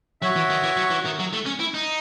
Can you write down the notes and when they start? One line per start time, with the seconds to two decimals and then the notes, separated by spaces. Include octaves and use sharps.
0.21 F#3 F#4 C#5 E5
0.36 E3
0.50 D#3
0.63 E3
0.77 F#3
0.90 E3
1.05 D#3
1.19 F#3
1.33 A3
1.46 C#4
1.60 E4
1.74 D#4